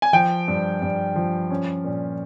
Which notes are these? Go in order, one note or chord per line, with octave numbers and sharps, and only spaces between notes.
G#5
F3 G5
G2
G2
F3
C#4
A#2